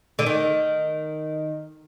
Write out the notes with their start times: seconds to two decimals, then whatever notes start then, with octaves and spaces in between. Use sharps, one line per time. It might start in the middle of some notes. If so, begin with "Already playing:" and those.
0.19 D3
0.26 D#3